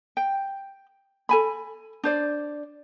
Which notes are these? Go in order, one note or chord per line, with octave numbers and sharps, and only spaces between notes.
G5
A4 G#5 B5
D4 C5 D5